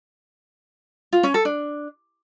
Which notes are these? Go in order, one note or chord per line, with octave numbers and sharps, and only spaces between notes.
F4
C#4
A4
D4